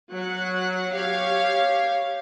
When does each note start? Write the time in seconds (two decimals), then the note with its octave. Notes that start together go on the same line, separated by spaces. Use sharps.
0.11 F#3 F#5
0.93 G4 C#5 F5